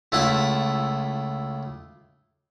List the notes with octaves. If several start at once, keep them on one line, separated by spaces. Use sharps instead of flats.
C#2 A3 E4 F4 F#5 B5